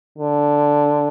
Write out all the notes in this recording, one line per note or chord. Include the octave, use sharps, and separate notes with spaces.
D3